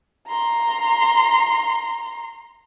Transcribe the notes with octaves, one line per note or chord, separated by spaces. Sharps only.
A#5 C6